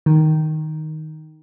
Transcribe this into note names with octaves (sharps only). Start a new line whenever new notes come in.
D#3